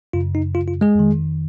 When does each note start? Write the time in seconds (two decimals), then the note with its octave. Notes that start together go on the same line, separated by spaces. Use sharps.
0.13 F#2 C#3 F4
0.35 D#4
0.55 F4
0.68 F4
0.81 G#3 G#4
0.95 F2 D#3